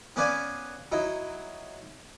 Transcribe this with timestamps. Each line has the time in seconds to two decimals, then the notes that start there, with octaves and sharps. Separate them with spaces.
0.16 B3 C#4 B4 D5 F5 G#5
0.92 F#3 D#4 E4